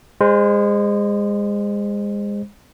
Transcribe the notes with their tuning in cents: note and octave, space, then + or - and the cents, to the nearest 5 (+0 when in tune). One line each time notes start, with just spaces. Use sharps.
G#3 -25 C5 +0